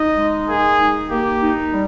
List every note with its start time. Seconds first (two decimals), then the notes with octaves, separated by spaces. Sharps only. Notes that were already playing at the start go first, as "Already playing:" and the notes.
Already playing: D#4 D#5
0.16 G#3
0.47 A#3 G#4
0.79 D#4
1.10 A#3 G4
1.41 D#4
1.72 G3